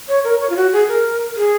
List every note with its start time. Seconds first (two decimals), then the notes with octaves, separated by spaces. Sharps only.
0.08 C#5
0.24 A#4
0.40 C#5
0.50 F4
0.56 F#4
0.73 G#4
0.88 A#4
1.36 G#4